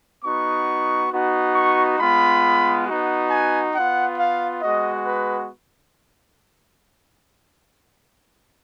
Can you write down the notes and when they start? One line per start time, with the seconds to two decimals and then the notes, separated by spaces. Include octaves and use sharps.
0.23 B3 D#4 F#4 C#6
1.11 B3 D#4 F#4
1.54 C#6
1.99 G#3 B3 F4 B5
2.86 B3 D#4 F#4
3.30 G#5
3.74 B3 F4 F#5
4.19 F5
4.62 G#3 B3 F#4 D#5
5.06 B4